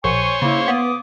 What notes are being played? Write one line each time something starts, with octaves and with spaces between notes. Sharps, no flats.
A#1 C5 C#5 G#5 C#6
C#3 A#3 E4
B3 D6 D#6